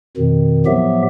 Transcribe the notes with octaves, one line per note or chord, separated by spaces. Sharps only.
F2 B2 D#3
A2 F3 F#3 B3 G4 E5